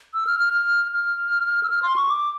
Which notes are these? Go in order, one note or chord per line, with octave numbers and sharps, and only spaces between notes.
E6
F6
F6
F6
F6
E6
F6
C6
C#6
D6